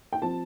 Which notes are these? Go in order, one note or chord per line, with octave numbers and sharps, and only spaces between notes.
G5
F3 C4 A5